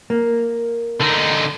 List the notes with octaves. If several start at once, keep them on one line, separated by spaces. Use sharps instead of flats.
A#3
D3 D#4